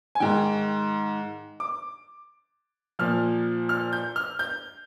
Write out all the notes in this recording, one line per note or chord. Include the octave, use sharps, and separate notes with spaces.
G#5
G#2 D#3 G5
D6
A#2 F3 F6
F6
G6
F6
G6